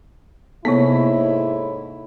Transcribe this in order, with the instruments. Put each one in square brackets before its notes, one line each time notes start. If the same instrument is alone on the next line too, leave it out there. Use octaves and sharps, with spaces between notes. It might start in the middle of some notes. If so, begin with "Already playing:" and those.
[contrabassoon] G#2 [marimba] C3 A#3 B3 [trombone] E4 [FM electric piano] A4 C#5